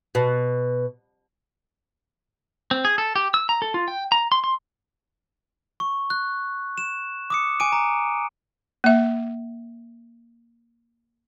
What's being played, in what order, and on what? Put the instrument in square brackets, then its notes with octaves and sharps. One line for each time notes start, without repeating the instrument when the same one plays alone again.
[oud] B2
[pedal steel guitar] C4
G#4
A4
G4
E6
A#5
A4
F4
G5
A#5
C6
C6
[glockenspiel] C#6
F#6
E7
D6 D#6 C#7
G#5 D6 D7 D#7
A#5
[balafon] A#3 E5